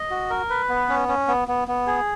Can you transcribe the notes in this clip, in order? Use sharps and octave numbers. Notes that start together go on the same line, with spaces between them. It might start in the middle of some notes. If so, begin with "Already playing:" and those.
Already playing: D#5
F#4
A#4
B4
B3
C#4
C#4
B3
B3
B3
G#4